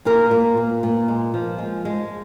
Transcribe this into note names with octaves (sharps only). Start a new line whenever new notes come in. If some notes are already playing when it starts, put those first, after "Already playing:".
A#2 F4 A#4
A#2
A#2
A#2
G#3
F3
G#3
G#3